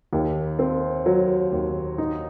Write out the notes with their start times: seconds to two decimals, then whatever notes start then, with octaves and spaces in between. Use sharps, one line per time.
0.13 D#2
0.59 C4
1.06 F#3
1.52 D#2
1.98 D#4